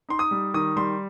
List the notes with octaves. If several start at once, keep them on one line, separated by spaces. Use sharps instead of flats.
D#4 C6
D#6
G3
D#3 D#6
G3 C6